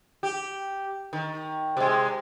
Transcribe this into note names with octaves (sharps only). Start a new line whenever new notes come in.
G4
D#3
C3 G#3